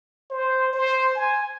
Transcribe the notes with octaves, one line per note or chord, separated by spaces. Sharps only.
C5
C5
G#5